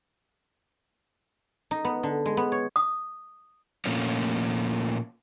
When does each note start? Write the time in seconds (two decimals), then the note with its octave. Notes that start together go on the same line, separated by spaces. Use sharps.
1.71 D#4
1.85 B3
2.03 D3
2.26 G#3
2.37 B3
2.52 C#5
2.76 D#6
3.85 A#2 F3 A3 A#3 C#4